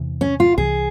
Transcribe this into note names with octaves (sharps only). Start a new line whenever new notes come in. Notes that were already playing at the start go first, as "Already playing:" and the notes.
Already playing: E2 C3 E3
C#4
F4
C2 C3 E3 G#4